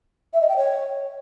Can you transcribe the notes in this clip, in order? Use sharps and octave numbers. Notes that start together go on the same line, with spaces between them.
E5
D#5
G5
C#5